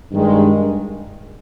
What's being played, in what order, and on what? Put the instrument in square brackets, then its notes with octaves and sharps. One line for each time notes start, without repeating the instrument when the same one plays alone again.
[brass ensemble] G2 D#3 G#3